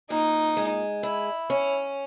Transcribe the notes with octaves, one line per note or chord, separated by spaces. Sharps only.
A#2 D#4
G#3
E4
C#4